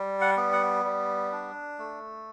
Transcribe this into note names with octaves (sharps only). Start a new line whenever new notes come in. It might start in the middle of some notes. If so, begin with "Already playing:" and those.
Already playing: G3
F#5
B3
F#5
G3
D4
A3